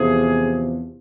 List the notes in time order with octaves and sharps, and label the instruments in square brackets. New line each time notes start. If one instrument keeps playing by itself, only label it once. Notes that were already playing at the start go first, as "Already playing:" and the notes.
Already playing: [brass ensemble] E2 C3 F3 G#4